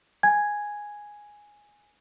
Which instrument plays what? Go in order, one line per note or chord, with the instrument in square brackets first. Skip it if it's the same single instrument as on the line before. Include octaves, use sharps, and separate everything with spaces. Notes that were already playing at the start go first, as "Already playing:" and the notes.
[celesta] G#5 G#6